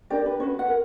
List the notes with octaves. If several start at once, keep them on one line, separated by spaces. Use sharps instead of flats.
D4 G4 A#4 D5
B4
C#4 F#4 B4 C#5
F#5
A#4